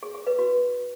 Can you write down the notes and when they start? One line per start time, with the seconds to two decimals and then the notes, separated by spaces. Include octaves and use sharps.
0.03 G#4
0.15 G#4
0.27 B4
0.39 F#4